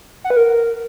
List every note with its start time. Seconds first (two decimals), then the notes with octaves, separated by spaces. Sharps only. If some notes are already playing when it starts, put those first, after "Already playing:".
0.24 F#5
0.30 B4
0.36 A#4